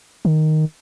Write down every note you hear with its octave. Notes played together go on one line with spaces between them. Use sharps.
D#3